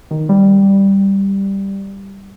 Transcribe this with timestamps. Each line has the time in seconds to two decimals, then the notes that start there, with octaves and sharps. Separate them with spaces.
0.11 D#3
0.29 G3